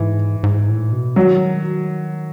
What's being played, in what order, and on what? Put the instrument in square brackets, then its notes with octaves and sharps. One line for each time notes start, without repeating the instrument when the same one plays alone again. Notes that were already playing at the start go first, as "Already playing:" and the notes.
Already playing: [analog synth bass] G#2 [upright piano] E3
[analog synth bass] G#2
A2
B2
[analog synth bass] D#3 [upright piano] F#3